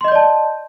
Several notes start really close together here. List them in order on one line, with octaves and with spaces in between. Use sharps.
C6 D#5 G6 D5 A5